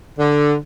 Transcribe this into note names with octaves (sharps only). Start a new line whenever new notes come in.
D3